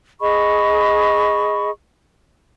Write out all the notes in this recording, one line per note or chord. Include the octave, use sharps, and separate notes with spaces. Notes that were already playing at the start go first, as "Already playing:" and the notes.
G#4 D#5 B5 C#6